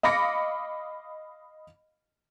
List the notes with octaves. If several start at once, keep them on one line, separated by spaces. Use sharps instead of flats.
D#5 F5 B5 D6 A#6 C#7